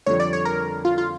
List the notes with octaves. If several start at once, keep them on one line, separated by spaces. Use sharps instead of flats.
F2 D3 G3 C#5
D5
C#5
A#4
F4
F4